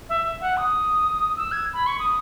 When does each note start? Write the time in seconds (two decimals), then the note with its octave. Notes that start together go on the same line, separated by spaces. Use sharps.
0.09 E5
0.41 F#5
0.57 D#6
1.36 E6
1.51 G#6
1.73 B5
1.86 C#6
1.99 D#6